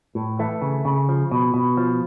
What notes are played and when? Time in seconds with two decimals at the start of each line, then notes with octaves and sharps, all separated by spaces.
0.15 A2
0.39 E3 A3
0.62 C#3
0.85 C#3
1.09 F3
1.31 B2
1.54 B2
1.77 F3